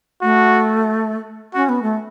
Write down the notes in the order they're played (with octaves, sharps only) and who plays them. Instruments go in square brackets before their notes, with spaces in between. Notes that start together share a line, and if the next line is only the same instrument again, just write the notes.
[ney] A3 [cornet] F#4
[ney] C#4 [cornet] F#4
[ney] B3
A3